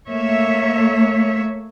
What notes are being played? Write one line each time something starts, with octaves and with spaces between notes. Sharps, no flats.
A3 A#3 C#5 E5